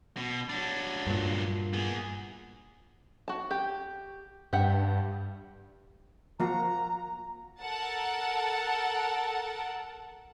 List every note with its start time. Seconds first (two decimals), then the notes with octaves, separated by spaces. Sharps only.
0.17 B2
0.50 F#3 D4
1.07 G2 A#2
1.73 B3 G#4
3.28 F#4 A5
3.51 G4
4.53 G2 G4 E5 F#5
6.40 F3 A#3 F#4 A#5
7.61 A4 A#4 F#5 A5